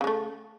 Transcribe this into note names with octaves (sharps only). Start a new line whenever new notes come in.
C#3 G#3 A3